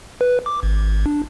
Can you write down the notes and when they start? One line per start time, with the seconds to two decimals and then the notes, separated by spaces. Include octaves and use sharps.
0.21 B4
0.46 D6
0.63 G#1
1.06 D4